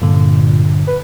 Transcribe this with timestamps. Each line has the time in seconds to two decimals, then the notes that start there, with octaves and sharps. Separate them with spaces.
0.02 G2 A#2 D3
0.87 B4